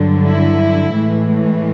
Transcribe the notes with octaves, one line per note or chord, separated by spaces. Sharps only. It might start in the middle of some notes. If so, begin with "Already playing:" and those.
Already playing: G2 D3 F#3
E4
A2 E3 G#3